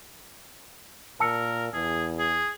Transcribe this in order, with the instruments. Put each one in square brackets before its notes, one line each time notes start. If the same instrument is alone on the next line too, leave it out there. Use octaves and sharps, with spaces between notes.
[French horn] A#2 [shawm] A#4 [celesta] A5 E6 C#7
[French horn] E2 [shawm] G#4
[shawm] G#4